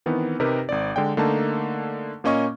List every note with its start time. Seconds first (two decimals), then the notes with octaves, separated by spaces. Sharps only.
0.06 D#3 E3 B3 C4
0.40 C3 D#4 G4 A#4 B4
0.69 G#1 C4 D5
0.96 D3 G#3 D5 G5
1.17 D3 A3 A#3 D#4 A5
2.24 A#2 A#3 C#4 D#5 C#6